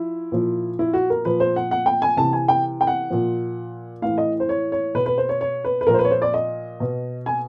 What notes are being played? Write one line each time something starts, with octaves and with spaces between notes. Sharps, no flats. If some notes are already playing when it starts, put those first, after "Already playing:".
Already playing: F3 E4
A#2 F3
E4
F#4
A#4
A#2 F3 B4
C5
F#5
F#5
G5
G#5
C3 E3 A5
G#5
G5
G5
F#5
A#2 F3
A2 E3 F5
D#5
C5
C#5
C#5
B2 B4
B4
C5
C#5
C#5
B4
B4
A#2 F3 A#4
C5
B4
C#5
C5
D5
D#5
B2
G#5